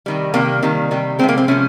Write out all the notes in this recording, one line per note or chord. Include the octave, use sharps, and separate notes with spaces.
C3 D#3 G3
C3 D#3 G3 A#3
C3 D#3 G3
C3 D#3 G3
C3 F3 G#3 C4
A#3
C4
C3 F3 G#3 C#4